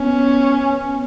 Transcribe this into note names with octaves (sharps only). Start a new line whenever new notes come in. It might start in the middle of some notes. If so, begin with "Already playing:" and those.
Already playing: B3 C#4